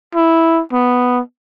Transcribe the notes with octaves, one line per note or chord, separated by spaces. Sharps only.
E4
B3